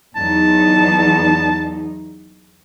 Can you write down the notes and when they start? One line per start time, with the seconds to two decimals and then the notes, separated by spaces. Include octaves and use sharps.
0.16 E2 F#3 D#4 A5